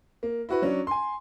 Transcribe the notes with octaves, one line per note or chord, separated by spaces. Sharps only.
A#3
E4 F#4 B4
F#3 C#4 D4
G#5 C6